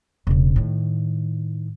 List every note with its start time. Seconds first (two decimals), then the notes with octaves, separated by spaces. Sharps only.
0.27 E1 C#3
0.56 A2 D#3